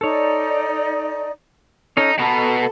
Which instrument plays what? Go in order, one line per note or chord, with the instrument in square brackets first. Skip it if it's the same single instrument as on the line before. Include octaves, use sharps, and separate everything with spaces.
[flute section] D#4 D5 [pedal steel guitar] A4 C#5
[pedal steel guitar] C#4 A4 C#5 [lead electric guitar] D#4
[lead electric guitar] B2 B3 [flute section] A4 [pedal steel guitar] A#5